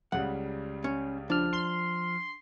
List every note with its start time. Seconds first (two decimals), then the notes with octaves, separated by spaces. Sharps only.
0.12 C#2 C#3 G3 F#5
0.84 C#4
1.30 F3 D4 F6
1.53 C6 G7